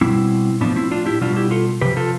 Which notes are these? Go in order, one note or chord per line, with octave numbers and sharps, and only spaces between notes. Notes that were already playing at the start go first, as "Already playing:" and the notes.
B2 G3 C4 E4
A2 F3 B3 D4
C4 E4
D4 F4
E4 G4
B2 G3 D4 F4
E4 G4
F4 A4
C3 F3 G4 B4
F4 A4